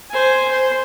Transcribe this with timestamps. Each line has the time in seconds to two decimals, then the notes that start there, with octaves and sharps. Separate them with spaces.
0.11 C5 G#5
0.51 C5